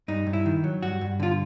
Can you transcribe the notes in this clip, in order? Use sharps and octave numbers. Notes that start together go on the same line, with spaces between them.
G2 D#4
G2
E4
D#3
F#3
G2 F#4
G2
D3 F4